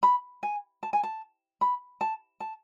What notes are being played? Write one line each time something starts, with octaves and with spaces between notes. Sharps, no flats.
B5
G#5
A5
G#5
A5
B5
A5
A5